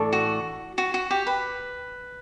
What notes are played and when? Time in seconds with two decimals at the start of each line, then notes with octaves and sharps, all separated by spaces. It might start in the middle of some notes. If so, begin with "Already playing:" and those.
Already playing: A2 E3 A3 D4 A4
0.13 F#4
0.78 F#4
0.94 F#4
1.11 G4
1.27 B4